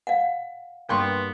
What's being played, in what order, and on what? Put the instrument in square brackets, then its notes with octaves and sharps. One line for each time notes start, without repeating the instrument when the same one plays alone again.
[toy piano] F5 F#5
[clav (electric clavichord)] G2 A#3 [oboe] B3 [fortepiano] G5 C6 C#6